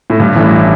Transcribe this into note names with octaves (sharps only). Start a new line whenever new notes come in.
A2
G2
A1 A2